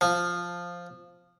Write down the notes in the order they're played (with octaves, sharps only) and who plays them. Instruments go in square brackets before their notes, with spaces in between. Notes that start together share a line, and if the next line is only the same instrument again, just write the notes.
[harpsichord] F3